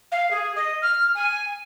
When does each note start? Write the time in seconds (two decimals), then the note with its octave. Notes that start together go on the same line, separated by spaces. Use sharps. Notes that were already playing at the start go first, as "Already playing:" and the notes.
0.12 F5
0.31 G#4
0.56 D#5
0.82 F6
1.15 G#5